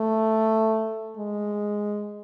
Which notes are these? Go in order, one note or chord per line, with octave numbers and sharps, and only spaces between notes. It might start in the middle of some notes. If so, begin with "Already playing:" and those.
Already playing: A3
G#3